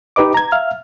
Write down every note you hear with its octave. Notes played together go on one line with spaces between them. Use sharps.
D#4 G4 B4 D#5 D6
A#5 G#6
E5 F5 F6